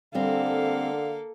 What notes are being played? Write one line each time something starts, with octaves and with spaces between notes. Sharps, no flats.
D3 G3 A#3 C4 A4 F5